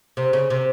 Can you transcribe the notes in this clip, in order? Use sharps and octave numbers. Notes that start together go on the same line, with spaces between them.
C3
C#3
C3